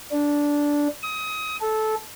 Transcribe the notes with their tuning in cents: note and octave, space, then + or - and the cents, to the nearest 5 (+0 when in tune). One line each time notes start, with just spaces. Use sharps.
D4 -10
D#6 +25
A4 -15